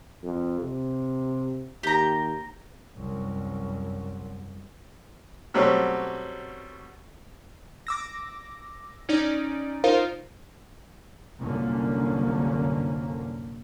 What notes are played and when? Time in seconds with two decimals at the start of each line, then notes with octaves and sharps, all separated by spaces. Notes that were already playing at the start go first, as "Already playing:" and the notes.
0.24 F2
0.60 C3
1.83 D#2 G4 A#5
2.97 C2 F#2
5.54 B2 F#3 G3 A3 C4 C#4
7.87 D6 E6 A#6
9.09 C#4 D#4 D5
9.84 D#4 F4 A#4 C5 F5
11.40 C2 F#2 A#2 D3 A#3 C#4